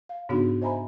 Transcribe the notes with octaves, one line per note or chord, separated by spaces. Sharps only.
F5
G#2 C#3 B3 D4 D#4 F#4
C5 D#5 E5 G#5 A#5 B5